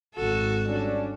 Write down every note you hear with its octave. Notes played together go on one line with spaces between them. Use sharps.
G#1 F#4 A4
G3 C#4 D4